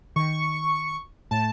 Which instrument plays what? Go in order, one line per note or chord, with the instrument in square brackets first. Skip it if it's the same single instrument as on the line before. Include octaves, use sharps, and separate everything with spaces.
[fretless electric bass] D#3 [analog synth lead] C#6
[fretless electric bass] A2 [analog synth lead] A5